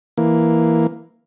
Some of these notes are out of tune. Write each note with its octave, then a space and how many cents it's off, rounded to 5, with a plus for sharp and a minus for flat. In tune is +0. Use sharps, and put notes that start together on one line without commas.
E3 +0 A#3 +0